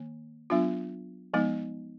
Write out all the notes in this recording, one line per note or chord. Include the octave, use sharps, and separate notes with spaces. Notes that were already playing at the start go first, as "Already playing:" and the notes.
Already playing: D#3 A#3
F#3 B3 D4 F4
F3 G#3 B3 D#4